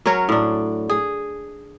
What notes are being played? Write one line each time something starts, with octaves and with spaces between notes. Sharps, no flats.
F#3 C#4 A#4 C#5
A2 D4
G#4